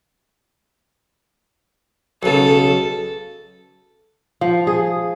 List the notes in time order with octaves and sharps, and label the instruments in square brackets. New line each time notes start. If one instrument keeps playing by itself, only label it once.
[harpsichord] B1 C#3 [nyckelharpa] A4
[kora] F3
G#4